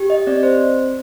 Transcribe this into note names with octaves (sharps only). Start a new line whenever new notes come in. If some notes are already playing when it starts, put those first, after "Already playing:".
Already playing: G4
D#5
C4 D5
C5